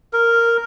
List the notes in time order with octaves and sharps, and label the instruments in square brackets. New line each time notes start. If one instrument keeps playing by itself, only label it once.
[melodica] A#4